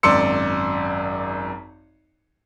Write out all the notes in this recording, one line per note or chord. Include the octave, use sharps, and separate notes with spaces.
G#1 F#2 D5 C6 E6 C#7